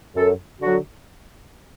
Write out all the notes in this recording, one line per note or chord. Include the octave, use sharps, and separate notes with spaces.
F#2 A4
D3 F#3 F#4